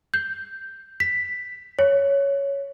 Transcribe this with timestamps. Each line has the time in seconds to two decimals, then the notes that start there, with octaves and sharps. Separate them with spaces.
0.14 G6
1.00 B6
1.79 C#5